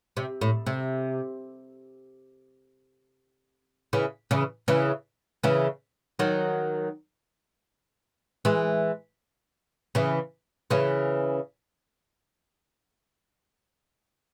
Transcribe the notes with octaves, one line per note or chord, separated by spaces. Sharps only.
C3
A2
C3
C#3 E3
C#3 E3
C#3 E3
C#3 E3
D#3 F#3
E3 G#3
C#3 E3
C#3 E3